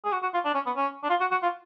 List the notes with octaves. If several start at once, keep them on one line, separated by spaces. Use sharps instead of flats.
G#4
F#4
F#4
F4
D4
C#4
B3
C#4
D4
F4
F#4
F#4
F4